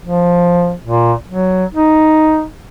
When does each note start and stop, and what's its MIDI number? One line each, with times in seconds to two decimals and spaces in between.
0.04 0.74 53
0.84 1.13 46
1.28 1.65 54
1.74 2.45 63